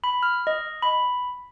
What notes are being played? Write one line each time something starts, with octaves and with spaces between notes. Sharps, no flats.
B5
F6
D#5
B5